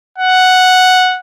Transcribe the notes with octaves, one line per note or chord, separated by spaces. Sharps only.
F#5